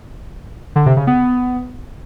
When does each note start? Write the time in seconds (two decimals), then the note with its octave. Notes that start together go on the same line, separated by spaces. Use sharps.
0.76 D3
0.86 C3
0.97 C#3
1.07 B3